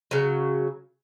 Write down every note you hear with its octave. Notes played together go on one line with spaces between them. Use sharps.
C#3 F#3